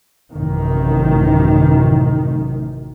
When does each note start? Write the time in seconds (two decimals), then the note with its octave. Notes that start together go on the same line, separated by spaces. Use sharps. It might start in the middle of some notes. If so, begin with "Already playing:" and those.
0.34 A1 F#2 C3 D#3